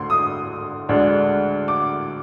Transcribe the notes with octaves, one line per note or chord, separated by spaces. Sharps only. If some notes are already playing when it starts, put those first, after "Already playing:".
Already playing: D2 D3 C6
D#6
D2 D3 G#3 D4
D6